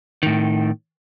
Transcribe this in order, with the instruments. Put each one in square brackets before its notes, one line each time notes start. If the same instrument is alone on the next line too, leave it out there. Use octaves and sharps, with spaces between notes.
[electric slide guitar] A2 D#3